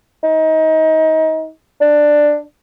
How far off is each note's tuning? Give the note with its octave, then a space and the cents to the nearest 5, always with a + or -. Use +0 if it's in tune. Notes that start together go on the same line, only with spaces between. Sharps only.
D#4 +30
D4 +10